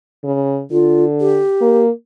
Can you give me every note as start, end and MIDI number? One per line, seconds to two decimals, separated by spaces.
0.24 0.62 49
0.71 1.41 50
0.71 1.04 65
1.20 1.83 67
1.61 1.89 58